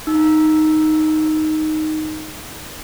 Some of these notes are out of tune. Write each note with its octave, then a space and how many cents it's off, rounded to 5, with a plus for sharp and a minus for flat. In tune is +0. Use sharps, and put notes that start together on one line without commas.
D#4 +0 E6 +0